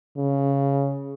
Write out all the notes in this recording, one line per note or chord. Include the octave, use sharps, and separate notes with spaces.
C#3